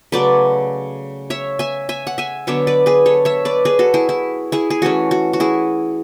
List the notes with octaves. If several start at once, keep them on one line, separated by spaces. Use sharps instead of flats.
C#3 F#3 A3 B4 D5
C#5 E5
E5 G#5
E5 G#5
F#5
E5 G#5
D3 F#3 B3 D4 C#5 E5
B4 D5
G#4 B4
A4 C#5
C#5 E5
B4 D5
G#4 B4
F#4 A4
E4 G#4
E4
E4 G#4
G#4
E3 A3 C#4 F#4
F#4
F#4
E4 G#4